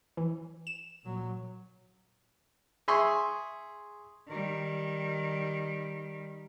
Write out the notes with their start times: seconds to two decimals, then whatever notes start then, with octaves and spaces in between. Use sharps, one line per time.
0.17 E3
0.67 E7
1.03 A#2 F#3
2.88 G#4 E5 C6 C#6
4.27 D#3 G3